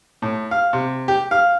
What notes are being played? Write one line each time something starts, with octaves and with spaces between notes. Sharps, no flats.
A2
F5
C3
G4
F5